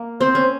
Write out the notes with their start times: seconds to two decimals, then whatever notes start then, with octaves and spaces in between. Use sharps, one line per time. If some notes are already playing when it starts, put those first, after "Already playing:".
Already playing: A#3
0.21 C4 C5
0.35 C#4